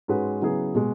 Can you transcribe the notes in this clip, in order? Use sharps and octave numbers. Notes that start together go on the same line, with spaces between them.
G#2 G#3 C#4 F#4 B4
C#3 F#3 B3 E4 G#4
B2 G#3